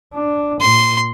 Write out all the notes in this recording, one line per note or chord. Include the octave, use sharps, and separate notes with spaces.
D4
A#2 C6